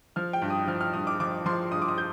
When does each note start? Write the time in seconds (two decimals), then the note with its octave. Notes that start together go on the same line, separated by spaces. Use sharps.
0.16 F3 F6
0.33 G5
0.42 G2
0.50 D#6
0.67 F3 F6
0.81 F6
0.94 G2 D#6
1.07 D6
1.20 F3 D6
1.46 F3 C6
1.71 G2 D#6
1.82 D6
1.88 D#6
1.98 G6